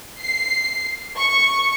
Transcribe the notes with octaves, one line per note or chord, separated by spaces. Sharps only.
C7
C#6